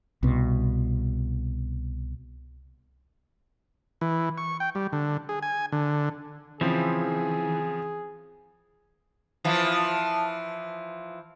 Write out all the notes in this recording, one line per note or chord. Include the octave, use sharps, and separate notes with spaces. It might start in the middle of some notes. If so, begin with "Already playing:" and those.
C2 B2
E3
C#6
G5
G3
D3
G#4
G#5
D3
C#3 E3 F3 C4 G#4
E3 F3